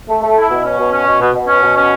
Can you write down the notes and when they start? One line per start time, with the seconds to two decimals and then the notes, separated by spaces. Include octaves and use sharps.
0.08 A3
0.22 A3
0.36 E4
0.50 B2
0.65 C#4
0.79 B2
0.92 C#4
1.06 B2
1.21 B2
1.34 B2
1.48 C#4
1.62 B2
1.76 C#4